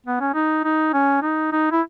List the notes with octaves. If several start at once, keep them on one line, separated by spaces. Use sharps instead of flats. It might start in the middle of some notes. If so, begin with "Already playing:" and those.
B3
C#4
D#4
D#4
C#4
D#4
D#4
E4